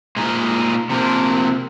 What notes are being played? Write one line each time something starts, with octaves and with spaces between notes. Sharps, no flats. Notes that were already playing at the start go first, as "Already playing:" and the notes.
A#2 G#3 D#4
C3 F3 A#3